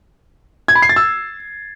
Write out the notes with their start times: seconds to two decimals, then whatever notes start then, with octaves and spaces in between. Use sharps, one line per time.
0.68 G#6
0.75 B5
0.82 C7
0.89 A6
0.96 E6